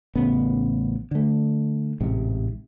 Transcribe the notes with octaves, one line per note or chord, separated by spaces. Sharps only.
A1 C#3 B3
D3 A3
A1 G#2 C3